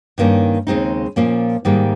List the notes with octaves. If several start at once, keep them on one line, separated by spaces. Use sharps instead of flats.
G2 D#3 A#3 C#4
D#2 C#3 G#3 C4 D#4
A#2 F3 A#3 C#4
G#2 D#3 G3 A#3